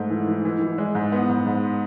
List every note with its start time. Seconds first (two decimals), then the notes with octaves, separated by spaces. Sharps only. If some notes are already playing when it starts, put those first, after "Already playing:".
Already playing: G#2 A3
0.10 E3
0.27 E3
0.45 E3
0.62 E3
0.78 G#3
0.95 G#2
1.12 B3
1.29 G#2
1.46 G#2